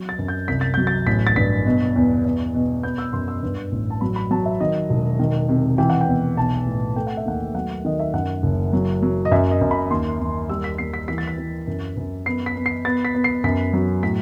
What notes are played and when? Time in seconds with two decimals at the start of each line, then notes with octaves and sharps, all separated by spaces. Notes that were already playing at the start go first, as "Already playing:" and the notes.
Already playing: F#3
0.09 A6
0.19 F#2
0.28 G6
0.48 C2 B6
0.61 A6
0.74 F#3 G6
0.87 A6
1.07 A1 B6
1.27 A6
1.36 G2 B6
1.66 B2
1.96 E2
2.25 E2
2.54 B2
2.83 B3 G6
2.98 E6
3.13 F#2 C6
3.28 E6
3.43 G2
3.72 A1
3.90 A5
4.01 F#3 B5
4.16 B5
4.31 F#3 A5
4.45 E5
4.60 D#3 D#5
4.90 E1
5.19 D#3
5.49 C3
5.78 E3 G5
5.90 F#5
6.01 G5
6.07 E2
6.37 B1 A5
6.66 A2
6.96 A3 G5
7.07 F#5
7.17 E5
7.25 D#2 F#5
7.54 F#3 F#5
7.85 D#3 D#5
8.00 E5
8.13 F#2 F#5
8.43 F#1
8.73 F#3
9.03 F#3
9.25 D#5
9.31 F#2 E5
9.51 D#5
9.61 F#2
9.71 B5
9.90 D#2 C6
10.20 D#2
10.49 G3 E6
10.64 B6
10.78 D#2 C7
10.94 B6
11.08 E3 B6
11.18 A6
11.28 B6
11.38 E3
11.67 F#2
11.97 F#2
12.26 B3 C7
12.46 B6
12.56 B3
12.66 C7
12.85 B3 A6
13.05 B6
13.15 B3
13.24 C7
13.44 F#2 B6
13.73 F#3
14.03 A2 B6